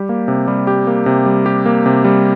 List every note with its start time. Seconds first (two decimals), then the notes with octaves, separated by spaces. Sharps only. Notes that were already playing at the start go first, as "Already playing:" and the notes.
Already playing: G3 G4
0.09 A#3
0.28 C3
0.47 G3
0.67 G4
0.87 A#3
1.06 C3
1.26 G3
1.46 G4
1.66 A#3
1.86 C3
2.04 G3